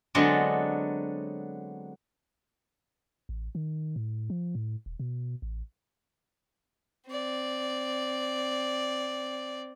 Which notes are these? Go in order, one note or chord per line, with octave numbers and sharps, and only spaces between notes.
D3 F#3 G#3 B3 C4 D4
A1
D#3
A2
F3
A2
D#1
B2
A1
C4 D5